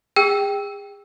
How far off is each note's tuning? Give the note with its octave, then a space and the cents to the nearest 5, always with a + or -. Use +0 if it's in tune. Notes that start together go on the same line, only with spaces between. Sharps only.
G#4 -35 G5 +0 E6 +0